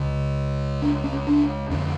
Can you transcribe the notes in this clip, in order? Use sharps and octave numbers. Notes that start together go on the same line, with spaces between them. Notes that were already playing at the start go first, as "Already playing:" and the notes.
Already playing: C#2 C#3
D4
C#4
D4
F2 D3 C#4